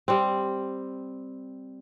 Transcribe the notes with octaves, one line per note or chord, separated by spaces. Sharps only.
G3 C4